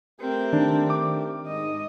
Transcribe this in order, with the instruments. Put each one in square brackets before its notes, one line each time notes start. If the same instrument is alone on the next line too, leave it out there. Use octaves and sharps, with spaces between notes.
[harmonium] A3 G4 A#4 [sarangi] C4
[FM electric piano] D#3 [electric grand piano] D4
[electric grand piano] D6
[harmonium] G#2 G#3 [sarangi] D#5